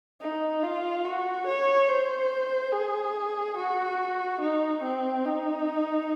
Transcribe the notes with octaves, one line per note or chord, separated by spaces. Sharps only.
D#4
F4
F#4
C#5
C5
G#4
F#4
D#4
C4
D#4